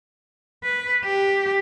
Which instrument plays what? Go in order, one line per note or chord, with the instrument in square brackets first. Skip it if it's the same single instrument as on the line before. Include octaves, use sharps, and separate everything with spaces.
[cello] B4
G4